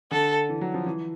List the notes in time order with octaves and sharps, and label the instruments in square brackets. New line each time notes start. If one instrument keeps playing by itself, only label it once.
[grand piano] D3 [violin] A4
[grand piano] E3
F#3
F3
E3